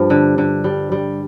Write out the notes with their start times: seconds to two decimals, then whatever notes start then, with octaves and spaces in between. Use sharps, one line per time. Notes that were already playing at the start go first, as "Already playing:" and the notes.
Already playing: G2 F3
0.10 D3
0.38 D3
0.64 G3
0.92 G3